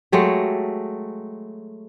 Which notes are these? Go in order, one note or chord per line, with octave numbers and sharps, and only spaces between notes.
F#3 G#3 A3 G4